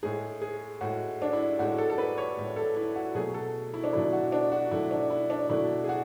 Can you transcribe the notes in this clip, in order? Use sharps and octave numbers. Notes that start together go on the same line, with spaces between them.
A2 G#3 G#4
G#4
A2 G#3 F#4
D4
E4
A2 G#3 F#4
A4
A4
B4
C#5
A2 G#3
A4
E4
F#4
B2 F#3 A3 G#4
A4
E4
D4
B2 F#3 A3 E4
F#4
D4
F#4
B2 F#3 A3 E4
D4
E4
D4
B2 F#3 A3 E4
G#4
F#4